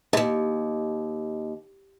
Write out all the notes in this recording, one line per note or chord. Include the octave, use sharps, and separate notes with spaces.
D#2 G#2